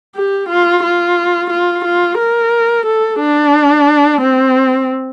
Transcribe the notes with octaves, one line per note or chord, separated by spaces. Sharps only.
G4
F4
F4
F4
F4
A#4
A4
D4
C4